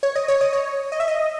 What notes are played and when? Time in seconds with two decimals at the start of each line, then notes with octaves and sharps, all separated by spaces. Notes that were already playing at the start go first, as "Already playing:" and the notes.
0.03 C#5
0.16 D#5
0.28 C#5
0.41 D#5
0.53 C#5
0.92 D#5
1.00 E5
1.08 D#5